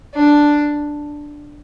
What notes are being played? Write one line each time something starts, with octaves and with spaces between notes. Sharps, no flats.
D4